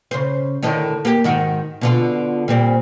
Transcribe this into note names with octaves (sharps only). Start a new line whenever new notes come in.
C#3 C5
A2 D3 D#3
A#3 G4
G#2 D#3 F#4
B2 D3 F4
A#2 G3 C4